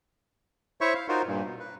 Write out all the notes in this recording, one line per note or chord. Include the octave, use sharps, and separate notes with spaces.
E4 C5 C#5 E5 C#6
F5
D#4 F4 F#4 A#4 C5
G2 A#2
B2
B4